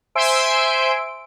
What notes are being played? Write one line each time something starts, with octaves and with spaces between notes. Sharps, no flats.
C5 E5 G#5 C6 E6 D7